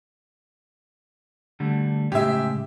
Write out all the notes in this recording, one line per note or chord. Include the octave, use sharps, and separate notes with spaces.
D3 G3 A3
A2 C#3 G#3 G4 E5